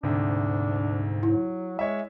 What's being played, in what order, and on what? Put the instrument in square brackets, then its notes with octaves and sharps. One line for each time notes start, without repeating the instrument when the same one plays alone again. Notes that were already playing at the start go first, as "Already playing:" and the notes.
[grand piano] D2 C3 [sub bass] G#2 [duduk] D4
[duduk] F#3 [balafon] E4
[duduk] G#3 [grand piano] C#5 E5